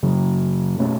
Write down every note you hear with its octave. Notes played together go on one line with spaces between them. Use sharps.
F#2 C#3 F#3
B2 A3 C#4